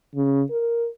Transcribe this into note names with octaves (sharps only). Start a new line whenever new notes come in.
C#3
A#4